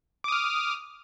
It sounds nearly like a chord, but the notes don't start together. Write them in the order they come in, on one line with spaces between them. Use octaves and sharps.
D6 D#6 F6